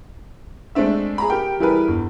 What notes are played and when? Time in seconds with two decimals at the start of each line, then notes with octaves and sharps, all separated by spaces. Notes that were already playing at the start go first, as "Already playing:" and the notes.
0.75 G#3 A3 C4 D4 E5
1.18 G#4 A#5 B5
1.30 G4 A#4 G5
1.60 E3 G3 E4 G#4 A#4 B4
1.88 G1